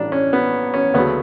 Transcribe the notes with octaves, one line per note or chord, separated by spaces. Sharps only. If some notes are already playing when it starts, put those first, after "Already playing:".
Already playing: A1 A2 G3 D4
C#4
B3
C#4
D2 C#3 F#3 A3 B3